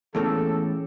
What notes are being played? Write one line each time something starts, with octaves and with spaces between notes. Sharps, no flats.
E2 A2 A#3 C#4 G#4 A4